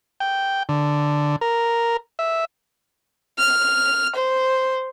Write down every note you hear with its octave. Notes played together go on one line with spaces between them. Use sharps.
G5
D3
A#4
E5
F6
C5